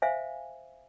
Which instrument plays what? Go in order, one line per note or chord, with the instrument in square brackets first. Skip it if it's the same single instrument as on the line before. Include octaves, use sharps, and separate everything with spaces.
[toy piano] C5 E5 F5 G#5